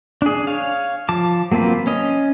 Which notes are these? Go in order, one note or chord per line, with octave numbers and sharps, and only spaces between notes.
D4 G#4
C#5 F5
F3 A5 D6
F#3 A#3 C4 F4 B4
C#4 D#5